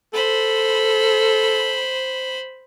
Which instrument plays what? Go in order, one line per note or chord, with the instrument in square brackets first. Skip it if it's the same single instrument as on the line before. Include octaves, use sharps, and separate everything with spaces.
[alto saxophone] A4 [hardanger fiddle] C5 B5